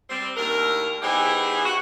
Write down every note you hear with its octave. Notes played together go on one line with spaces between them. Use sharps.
G3 C4
D#2 A2 D4 A#4
E3 B3 D#4 G4 G#4 C5
F#4